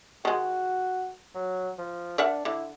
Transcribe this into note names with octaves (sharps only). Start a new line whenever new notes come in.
D#3 G#3 F#4
F#3
F3
D4 A#4 E5 F#5
D3 E4